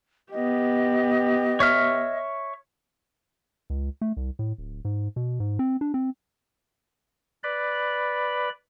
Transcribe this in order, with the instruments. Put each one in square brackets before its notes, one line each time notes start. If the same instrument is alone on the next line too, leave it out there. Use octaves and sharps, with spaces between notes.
[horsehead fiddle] B3 G4 [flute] D#5
[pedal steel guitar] C#5 E5 F6
[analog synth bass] C#2
A3
C2
A2
D1
G#2
B2
G#2
C4
D4
C4
[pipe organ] B4 D5 B5